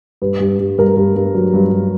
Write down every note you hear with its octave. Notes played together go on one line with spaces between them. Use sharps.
G2 B4
G2
G2
G2 A#4
G2
G2
F#3
G2
G2